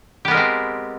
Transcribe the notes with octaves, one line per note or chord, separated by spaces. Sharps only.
G#3 B3 C4 G4 A#4